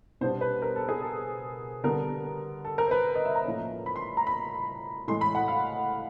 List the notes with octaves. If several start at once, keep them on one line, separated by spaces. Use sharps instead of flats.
B2 G3 B3 D4 C5
B4
A#4
A4
G#4
A4
D3 G3 B3 D4 A#4
A4
A#4
C5
B4
D#5
E5
A#5
A2 F3 A#3 C#4
B5
C6
A#5
B5
A2 E3 G#3 C6
B5
F#5
F5